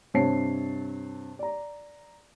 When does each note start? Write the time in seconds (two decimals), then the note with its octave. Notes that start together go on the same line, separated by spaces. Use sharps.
0.14 G2 C3 C4 C#5 A5 C7
1.39 D5 A#5